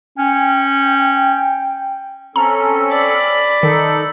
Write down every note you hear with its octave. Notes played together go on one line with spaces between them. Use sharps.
C#4 G5
C4 C#4 A4 A#5
D5 B5
D#3 D#4 A4